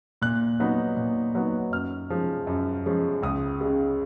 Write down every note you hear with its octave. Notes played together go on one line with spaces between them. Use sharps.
A#2 F#6
F#3 B3 D#4
A#2
F#3 B3 D#4
F#2 F6
F3 G#3 C#4
F#2
F3 G#3 C#4
C#2 D#6
C#3 G#3